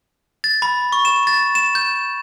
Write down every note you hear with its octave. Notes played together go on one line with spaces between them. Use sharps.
A6
B5
C#6
E7
A6
E7
G6